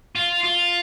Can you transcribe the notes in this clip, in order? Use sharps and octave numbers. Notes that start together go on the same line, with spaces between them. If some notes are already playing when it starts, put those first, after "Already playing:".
F4
F4